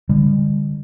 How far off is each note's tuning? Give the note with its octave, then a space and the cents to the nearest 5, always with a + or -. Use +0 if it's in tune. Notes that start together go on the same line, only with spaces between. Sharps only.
D3 +0 G3 +40